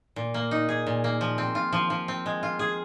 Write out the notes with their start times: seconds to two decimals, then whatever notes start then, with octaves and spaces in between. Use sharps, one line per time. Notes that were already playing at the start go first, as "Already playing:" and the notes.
0.16 A#2
0.34 A#3
0.51 D#4
0.69 G#4
0.87 A#2
1.04 A#3
1.21 F3
1.38 C4
1.55 F4
1.73 F3
1.90 F3
2.08 C4
2.26 G#3
2.43 F4
2.59 G#4